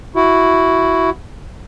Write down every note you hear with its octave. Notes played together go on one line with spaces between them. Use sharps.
E4 F#4